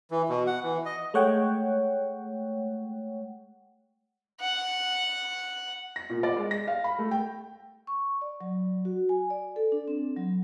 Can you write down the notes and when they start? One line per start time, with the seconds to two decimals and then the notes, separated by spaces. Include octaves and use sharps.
0.11 E3
0.29 B2
0.47 F#5
0.63 E3
0.86 D#5
1.14 G#3 A3 C#5 F#5 G5
4.41 F#5
5.96 A#6
6.10 A#2
6.23 D5
6.37 G#3
6.51 A#6
6.67 F5
6.84 B5
6.98 A3
7.11 G5
7.87 C#6
8.21 D5
8.41 F#3
8.85 F#4
9.09 G#5
9.30 D5
9.56 A4
9.72 D4
9.88 C4
10.16 F#3